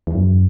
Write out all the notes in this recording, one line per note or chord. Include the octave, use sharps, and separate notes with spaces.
E2
F#2